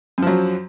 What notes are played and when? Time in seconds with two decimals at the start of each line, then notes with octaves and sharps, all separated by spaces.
0.18 F#2
0.22 F3
0.27 F#3